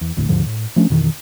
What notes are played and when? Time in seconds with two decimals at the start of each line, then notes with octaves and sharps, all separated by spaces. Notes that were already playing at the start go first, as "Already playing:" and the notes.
0.01 E2
0.17 F1 D2 A2 D3
0.29 D#2 G#2 D3 F3
0.46 A2
0.76 F3 A3 C#4 D4
0.90 F2 B2 D#3 E3